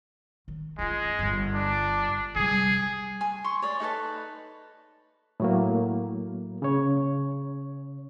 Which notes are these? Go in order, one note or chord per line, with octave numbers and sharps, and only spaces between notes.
D#3
G#3 C#4 F4
G1 G2
D4
C3 G3 G#4
G#5
C6 C#6
C#5 D5
D#4 A4 B4 A5
A2 F#3 A#3
C#3 C#5